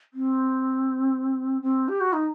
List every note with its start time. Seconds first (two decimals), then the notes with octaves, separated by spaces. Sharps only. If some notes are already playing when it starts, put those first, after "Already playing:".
0.14 C4
1.62 C4
1.88 G4
2.01 F#4
2.13 D#4